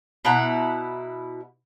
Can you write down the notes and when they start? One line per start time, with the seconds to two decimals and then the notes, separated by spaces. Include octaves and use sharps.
0.25 B2 E4 F#5 A#5